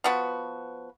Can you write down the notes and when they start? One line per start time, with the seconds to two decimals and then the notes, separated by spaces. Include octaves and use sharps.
0.04 F3 B3 F#4